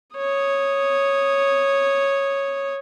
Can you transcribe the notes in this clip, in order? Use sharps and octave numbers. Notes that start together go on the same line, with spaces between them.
C#5 D#6